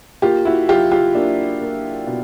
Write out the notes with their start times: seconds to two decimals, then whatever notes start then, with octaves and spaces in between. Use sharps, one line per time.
0.22 A#3 F4 G4
0.45 E4 F#4
0.69 F#3 F4 G4
0.92 F4 G4
1.15 A#3 D4
1.61 A#3
2.07 B2